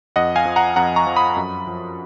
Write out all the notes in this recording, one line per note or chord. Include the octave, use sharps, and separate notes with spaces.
F2 D#5 F#5
F5 G#5
F3
F#5 A#5
F2 F#5 A#5
A#5 C#6
F3
B5 D#6
F#2
F3